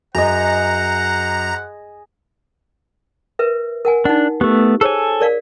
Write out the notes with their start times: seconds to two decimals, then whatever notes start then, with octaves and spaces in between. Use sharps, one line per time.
0.15 F#2 G#4 C5 D#5 F#5 A#5
3.39 A#4 B4 E5
3.85 A#4 F#5 G#5
4.05 D4 D#4 F#5
4.41 A3 B3 G4
4.81 G#4 A4 C5 C#5 G#5
5.20 A#4 D5 F5